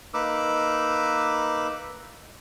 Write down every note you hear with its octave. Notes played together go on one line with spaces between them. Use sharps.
A#3 D#4 B4 D6 E6